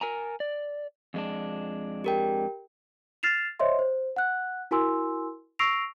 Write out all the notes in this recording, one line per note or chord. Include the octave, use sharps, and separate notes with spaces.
A#4 G#5 A#5
D5
F2 G#3 D4
G4 A#4 G5
F6 A6 C7 E7 F7
C5 C#5 D#5 E5 C6
C5
F#5 F#6
E4 F#4 A#4 G#5 C6 E6
C#6 E6 A#6 C7 D7 F7